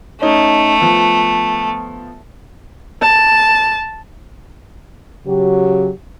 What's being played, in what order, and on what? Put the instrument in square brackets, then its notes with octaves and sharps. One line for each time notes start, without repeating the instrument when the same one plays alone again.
[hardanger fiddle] A3 [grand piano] C#4 D#4
[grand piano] F3 B3
[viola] A5
[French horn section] C#3 F#3 G4